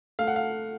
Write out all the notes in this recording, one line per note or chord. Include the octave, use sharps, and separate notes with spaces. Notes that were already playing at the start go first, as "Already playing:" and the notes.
A3 F5
F#5
F5